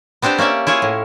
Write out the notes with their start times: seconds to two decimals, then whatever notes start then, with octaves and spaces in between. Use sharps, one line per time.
0.22 B3 C4 D4 G4 C5
0.38 A#3 C#4 D5 E5
0.67 E4 F4 G#4 C#5
0.82 A2